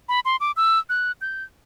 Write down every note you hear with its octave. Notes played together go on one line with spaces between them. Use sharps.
B5
C6
D6
E6
F#6
G6